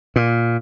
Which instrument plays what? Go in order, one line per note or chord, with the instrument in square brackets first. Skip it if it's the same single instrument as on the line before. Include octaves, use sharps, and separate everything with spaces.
[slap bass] A#2